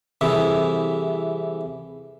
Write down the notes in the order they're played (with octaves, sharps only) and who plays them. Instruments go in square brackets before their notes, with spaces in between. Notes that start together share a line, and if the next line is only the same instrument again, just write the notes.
[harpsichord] C2 C3 E3 [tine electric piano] G#4 A4 E5